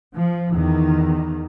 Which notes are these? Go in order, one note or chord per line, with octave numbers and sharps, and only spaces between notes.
F3
E2 D#3